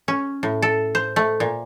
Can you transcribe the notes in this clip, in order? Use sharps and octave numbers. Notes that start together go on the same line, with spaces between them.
C#4
A2
A4
C5
A3
A#2